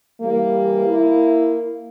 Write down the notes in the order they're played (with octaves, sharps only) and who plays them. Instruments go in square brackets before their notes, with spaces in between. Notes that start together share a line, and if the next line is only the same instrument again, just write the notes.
[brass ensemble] E3 G3 [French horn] A#3
[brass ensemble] E4